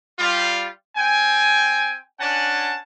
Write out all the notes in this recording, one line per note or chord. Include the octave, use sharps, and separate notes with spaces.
G3 F4
C4 G5 G#5
C#4 D4 F#5 G#5 A5